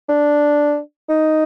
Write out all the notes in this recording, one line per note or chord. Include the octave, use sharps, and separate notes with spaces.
D4
D#4